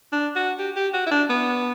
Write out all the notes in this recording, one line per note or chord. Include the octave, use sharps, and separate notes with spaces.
D4
F#4
G4
G4
F#4
E4
D4
B3